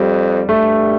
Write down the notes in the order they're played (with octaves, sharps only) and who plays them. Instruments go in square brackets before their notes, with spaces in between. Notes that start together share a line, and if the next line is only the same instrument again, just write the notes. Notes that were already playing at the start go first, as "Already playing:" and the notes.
Already playing: [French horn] F2 [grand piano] G3
[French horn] G2 [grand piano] A3